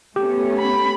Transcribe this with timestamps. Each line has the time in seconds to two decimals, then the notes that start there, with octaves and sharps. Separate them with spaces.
0.16 A3 B3 C#4 G4
0.59 B5